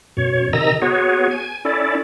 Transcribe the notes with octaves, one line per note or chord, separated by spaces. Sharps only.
F#2 B2 C#5
C3 D#3 D#5 A#5 E6
B3 F#4 G#4 C#5
G#5
C#4 E4 A4 D5